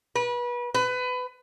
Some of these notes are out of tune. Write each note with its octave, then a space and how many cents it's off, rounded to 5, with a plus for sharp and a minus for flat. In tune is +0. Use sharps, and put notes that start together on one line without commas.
B4 -30
B4 +25